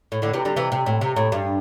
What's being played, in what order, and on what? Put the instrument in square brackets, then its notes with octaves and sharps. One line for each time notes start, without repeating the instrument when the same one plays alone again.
[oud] A2
A2 D3
C3 E3
D3 G3
C3 E3
C3
A2
C3
A2
G2